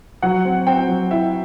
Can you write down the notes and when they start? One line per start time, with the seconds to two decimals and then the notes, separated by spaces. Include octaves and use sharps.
0.22 F#3 F#5
0.45 C4
0.67 C4 G5
0.89 F#3
1.11 E4 E5